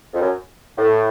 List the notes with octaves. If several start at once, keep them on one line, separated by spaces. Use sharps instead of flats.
F2
F#2
A2